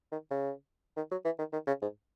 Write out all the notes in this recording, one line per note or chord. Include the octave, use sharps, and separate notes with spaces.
D#3
C#3
D#3
F#3
E3
D#3
D#3
C#3
G#2